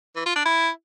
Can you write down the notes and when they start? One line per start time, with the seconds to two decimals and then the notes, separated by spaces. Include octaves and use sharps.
0.16 E3
0.26 F4
0.36 D4
0.46 E4